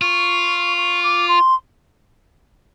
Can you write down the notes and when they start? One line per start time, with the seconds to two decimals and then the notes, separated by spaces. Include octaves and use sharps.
0.01 F4 C#6
0.77 C#6
1.03 D6
1.28 C6